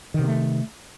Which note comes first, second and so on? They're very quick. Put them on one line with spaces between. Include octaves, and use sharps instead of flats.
D#3 C3 A#3 A3